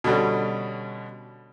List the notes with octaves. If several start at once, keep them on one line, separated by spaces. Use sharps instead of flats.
B2 D3 G3 C#4